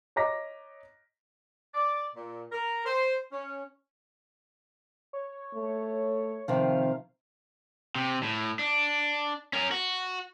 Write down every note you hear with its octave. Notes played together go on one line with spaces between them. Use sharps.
C#5 D#5 A#5 D6 A#6 B6
D5
A#2
A#4
C5
C#4
C#5
A3
C3 D#3 F3 F5
C3
A2
D4
C#4 A#4
F#4